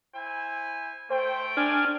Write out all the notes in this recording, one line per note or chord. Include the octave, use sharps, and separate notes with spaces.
E4 C5 G#5
A3 C5 G5
D4 G#5 F6